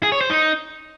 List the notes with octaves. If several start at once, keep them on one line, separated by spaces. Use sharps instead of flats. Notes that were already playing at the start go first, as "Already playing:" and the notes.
G#4
C#5
C5
D#4